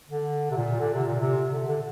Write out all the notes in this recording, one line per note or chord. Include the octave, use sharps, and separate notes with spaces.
D3
C3
A#2
D3
C3
A#2
C3
D3
D3